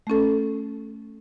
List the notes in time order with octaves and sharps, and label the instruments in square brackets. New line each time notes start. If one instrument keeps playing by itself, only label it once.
[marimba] A3 C#4 A4